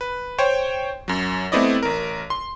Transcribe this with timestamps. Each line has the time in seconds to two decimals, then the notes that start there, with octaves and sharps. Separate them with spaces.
0.01 B4
0.38 C5 C#5 G5
1.08 F#2 F#3
1.52 A3 B3 C4 E4 D5 D#5
1.83 A1 A#4
2.30 C6